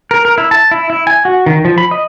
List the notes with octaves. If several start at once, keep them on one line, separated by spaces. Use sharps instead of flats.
A#4
A#4
E4
A5
E4
E4
G#5
F#4
D#3
F3
B5
D#5